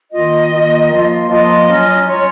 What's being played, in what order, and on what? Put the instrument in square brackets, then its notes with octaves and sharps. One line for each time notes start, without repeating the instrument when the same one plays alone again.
[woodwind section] D#3 A#3 F4 [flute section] D#5
[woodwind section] D#3 A#3 F4
F3 A#3 F4
[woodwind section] F3 A#3 F4 [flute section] D#5
[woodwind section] F#3 C#4 F4
[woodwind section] F#3 C#4 F4 [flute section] C#5